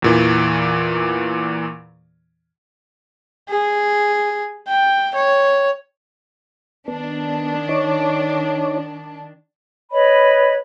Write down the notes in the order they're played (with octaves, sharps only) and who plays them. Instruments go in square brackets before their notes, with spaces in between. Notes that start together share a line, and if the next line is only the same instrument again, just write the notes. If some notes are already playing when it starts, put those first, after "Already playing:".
[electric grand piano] E2 A#2 E3
[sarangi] G#4
G5
C#5
[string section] D#3 D4 [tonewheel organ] B3
[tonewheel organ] D#4 C#5 D6
[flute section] B4 C#5 D#5 B5